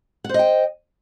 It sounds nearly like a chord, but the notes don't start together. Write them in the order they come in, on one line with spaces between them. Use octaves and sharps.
F#5 C5 D#5 G5